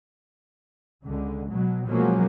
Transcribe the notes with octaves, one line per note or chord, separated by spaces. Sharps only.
C#2 D3
B2 F#3
B2 F3 F#3 G#3 A#3 C#4